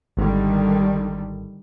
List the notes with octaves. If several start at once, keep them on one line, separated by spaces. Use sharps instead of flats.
G#1 D3 D#3 G3